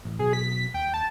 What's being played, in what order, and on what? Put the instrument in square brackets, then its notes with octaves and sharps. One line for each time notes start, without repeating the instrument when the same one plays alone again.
[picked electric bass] A1
[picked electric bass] B2 F#3 [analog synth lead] G#4
[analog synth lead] B6
[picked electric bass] D#2 [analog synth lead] G5
[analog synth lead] A5